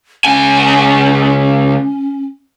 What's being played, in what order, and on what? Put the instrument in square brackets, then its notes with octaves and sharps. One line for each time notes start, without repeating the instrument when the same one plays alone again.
[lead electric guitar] C#2 G#5 [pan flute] C#4